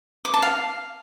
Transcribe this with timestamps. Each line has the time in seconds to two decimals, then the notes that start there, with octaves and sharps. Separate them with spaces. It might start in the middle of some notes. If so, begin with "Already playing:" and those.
0.25 D6
0.34 A5
0.42 F5